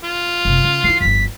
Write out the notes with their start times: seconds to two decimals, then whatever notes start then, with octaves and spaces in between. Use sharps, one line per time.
0.04 F4
0.45 F#1 C3
0.64 C#3
0.84 D#3 E4 C7
1.00 G1 F2 B6